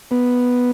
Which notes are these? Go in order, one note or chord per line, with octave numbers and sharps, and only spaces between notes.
B3